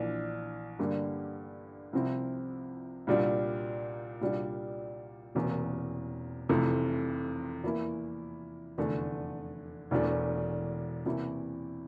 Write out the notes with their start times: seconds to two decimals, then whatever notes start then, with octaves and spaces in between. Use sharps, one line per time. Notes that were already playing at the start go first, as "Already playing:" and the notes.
Already playing: A#1 E3 A#3 D4
0.79 G2 D3 G3 A#3
1.93 C2 C3 F3 C4 E4
3.07 C2 A#2 G3 D4
4.21 C2 A#2 G3 D4
5.35 E1 E2 C3 E3 A#3
6.49 F1 F2 C3 E3 A3
7.64 E2 E3 A#3 E4
8.78 F1 E2 D3 A3
9.91 E1 E2 E3 A3 D4
11.06 E2 C3 E3 A#3 E4